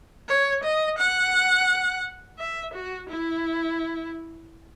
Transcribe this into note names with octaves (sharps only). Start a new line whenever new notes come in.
C#5
D#5
F#5
E5
F#4
E4